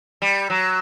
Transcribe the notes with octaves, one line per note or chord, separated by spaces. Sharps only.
G3
F#3